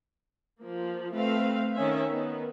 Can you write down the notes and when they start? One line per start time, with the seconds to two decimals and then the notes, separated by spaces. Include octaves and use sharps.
0.61 F3 A#3
1.14 A3 C4 B4 F5
1.75 D#3 C#4 E5
2.09 D#3 B3